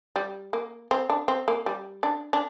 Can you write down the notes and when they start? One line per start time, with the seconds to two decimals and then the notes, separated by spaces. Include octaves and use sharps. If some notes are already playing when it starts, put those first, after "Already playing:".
0.16 G3
0.53 A#3
0.91 C4
1.10 D4
1.28 C4
1.48 A#3
1.66 G3
2.03 D4
2.33 D4